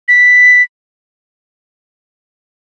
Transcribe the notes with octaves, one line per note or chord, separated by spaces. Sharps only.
B6